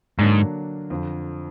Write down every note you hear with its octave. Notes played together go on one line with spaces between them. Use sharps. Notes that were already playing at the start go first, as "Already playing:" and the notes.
G#2 D3 F#3 A#3 D4
F2 D3 F3